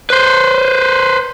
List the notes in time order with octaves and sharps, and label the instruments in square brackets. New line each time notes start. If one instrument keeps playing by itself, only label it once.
[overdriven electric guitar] B4 C5